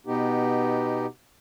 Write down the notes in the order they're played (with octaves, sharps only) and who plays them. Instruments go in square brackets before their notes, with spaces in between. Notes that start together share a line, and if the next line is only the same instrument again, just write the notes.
[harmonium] B2 B3 D#4 G4